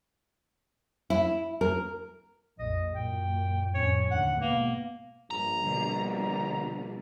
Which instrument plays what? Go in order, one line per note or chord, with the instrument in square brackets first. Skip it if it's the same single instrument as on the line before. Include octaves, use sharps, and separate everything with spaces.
[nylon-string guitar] E4
A#4
[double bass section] A#1 F2 [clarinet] D#5
[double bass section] F#2 A#2 [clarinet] G5
[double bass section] F2 A2 C#4 [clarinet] C#5
[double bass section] D#2 A2 D3 [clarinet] F#5
[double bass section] G#1 B2 B3 [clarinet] A#3
[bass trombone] A#1 [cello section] G2 [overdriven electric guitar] A#5
[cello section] B2 D3 G3